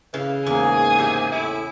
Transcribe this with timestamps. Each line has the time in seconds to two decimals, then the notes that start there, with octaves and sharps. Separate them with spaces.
0.14 C#3 E3
0.46 E2 G#2 A#3 G#4 G#5
0.98 C3 E5
1.32 A2 E4